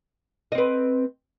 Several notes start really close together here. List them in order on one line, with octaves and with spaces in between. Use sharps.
D#5 C4 B4